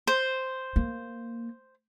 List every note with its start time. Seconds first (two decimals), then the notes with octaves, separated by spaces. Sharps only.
0.07 C5
0.76 A#3